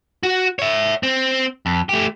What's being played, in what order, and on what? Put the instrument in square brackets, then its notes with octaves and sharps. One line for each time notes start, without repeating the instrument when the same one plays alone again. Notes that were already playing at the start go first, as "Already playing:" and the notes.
[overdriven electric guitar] F#4
C#5 E5
C4
F2
A3 G4